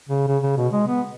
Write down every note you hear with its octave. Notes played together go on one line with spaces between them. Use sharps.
C#3
C#3
C#3
B2
G#3
B3